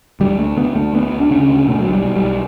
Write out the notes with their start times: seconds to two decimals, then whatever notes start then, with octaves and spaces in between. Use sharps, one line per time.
0.20 D2 G3
0.39 D2 A3
0.57 D2 B3
0.75 D2 A3
0.93 D2 B3
1.12 D2
1.21 D4
1.31 C#3 C#4
1.49 D2
1.67 B2 A3
1.81 B1 F#3
1.93 G3
2.04 B2
2.16 G3
2.22 B1